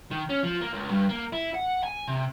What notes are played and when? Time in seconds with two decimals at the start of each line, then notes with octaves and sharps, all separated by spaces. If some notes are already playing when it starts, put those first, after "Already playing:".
0.11 D#3
0.30 C#4
0.44 F3
0.61 A#3
0.73 C#2
0.90 G2
1.09 A#3
1.33 E4
1.54 F#5
1.83 G#5
2.08 C3